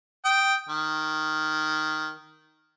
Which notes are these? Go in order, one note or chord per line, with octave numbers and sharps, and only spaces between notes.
G5 D#6
D#3